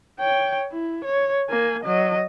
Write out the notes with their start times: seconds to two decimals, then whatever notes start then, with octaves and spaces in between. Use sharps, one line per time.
0.19 C#5 G5
0.73 E4
1.05 C#5
1.50 A#3 G#5
1.84 F#3 D#5